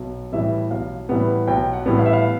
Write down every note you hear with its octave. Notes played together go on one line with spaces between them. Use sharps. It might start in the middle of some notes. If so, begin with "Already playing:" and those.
Already playing: B1
A2 E3 G3 B3 E5
B1 F5
A2 E3 G3 B3 F#5
B1 G5
F#5
A2 E3 G3 B3
F5
E5
F5